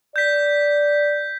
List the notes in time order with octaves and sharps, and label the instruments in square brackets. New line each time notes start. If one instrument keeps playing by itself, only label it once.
[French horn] D5 [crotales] G6 B6